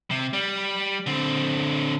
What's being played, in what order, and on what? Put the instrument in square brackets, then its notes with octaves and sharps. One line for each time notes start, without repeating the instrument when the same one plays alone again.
[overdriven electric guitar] C3
G3
D3 C4